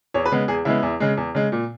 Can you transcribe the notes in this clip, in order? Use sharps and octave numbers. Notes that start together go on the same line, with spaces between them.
E2 C#5
B4
C#3 G#3 B3
E2 G#4
C#3 G#3 B3 E4
E2
C#3 G#3
E2
C#3 G#3
A#2